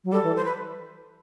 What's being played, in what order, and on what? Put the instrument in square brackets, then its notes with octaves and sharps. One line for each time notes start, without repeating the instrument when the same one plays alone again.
[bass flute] F#3
[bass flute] G3 [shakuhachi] A4
[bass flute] E3
[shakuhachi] C5
B4